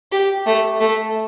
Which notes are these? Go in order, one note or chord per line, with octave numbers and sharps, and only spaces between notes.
G4
A3
A3